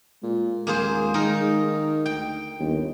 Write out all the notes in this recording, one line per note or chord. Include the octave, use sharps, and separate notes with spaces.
A#2 G#3
D#1 A#3 G#4 C5
D#3 D#4 A#4
D2 G5
G1 D#2